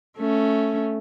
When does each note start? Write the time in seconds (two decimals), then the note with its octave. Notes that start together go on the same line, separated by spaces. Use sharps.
0.17 A3 C#4